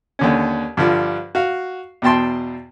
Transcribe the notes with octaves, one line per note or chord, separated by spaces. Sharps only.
D#2 D3 C#4
G2 D3 F3
F#4 F5
E2 B2 G5 A5 C6